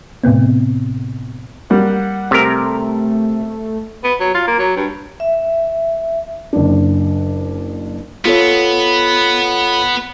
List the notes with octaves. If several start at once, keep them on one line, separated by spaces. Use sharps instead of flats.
A2 C3 B3 C4
G3 A#3 F#5
C3 A3 A#4
B3
F#3
F4
A#3
F#3
G2
E5
F#1 D4
B3 F4 A4 C#5